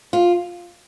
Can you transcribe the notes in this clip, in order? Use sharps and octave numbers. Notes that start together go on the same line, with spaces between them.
F4